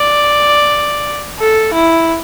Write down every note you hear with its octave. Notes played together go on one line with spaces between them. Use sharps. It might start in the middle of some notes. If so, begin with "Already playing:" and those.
Already playing: D5
A4
E4